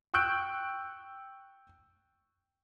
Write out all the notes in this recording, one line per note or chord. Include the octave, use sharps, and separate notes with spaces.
G5 C#6 E6 F#6 G6 D7